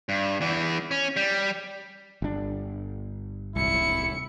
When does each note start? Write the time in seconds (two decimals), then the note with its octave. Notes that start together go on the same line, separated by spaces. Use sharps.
0.09 G2
0.41 E2 E3
0.91 C#4
1.16 G3
2.22 G1 D4
3.56 D1 C2 E4 C#7